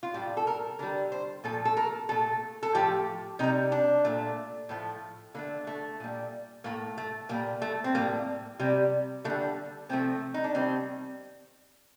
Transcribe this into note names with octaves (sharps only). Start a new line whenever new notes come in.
F4
A2 G3 G4
A4
A#4
D3 G3 A#4
C5
A#2 F3 A3 A4
A4
A#4
A#2 A3 A4
A4
A2 F3 A3 G4
C3 G3 D#4
D4
A#2 A3
A2 F3 A3
D3 A3 A#3
A3
A#2 G3
A2 A3 A#3
A3
A#2 G3 A#3
A3
C4
A2 G3 A#3
C3 G3
D3 A3
G3
C3 F3 A3 C4
D#4
D4
C3 D#3 G3 C4